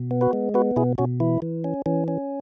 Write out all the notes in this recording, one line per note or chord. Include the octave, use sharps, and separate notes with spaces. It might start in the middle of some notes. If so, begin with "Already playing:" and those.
Already playing: B2
B3
F#4 B4
G#3
B3 F#4 B4
B2 E4 G#4
B2 C#4 F#4
E3 E4
E3
C#4
E3 C#4
C#4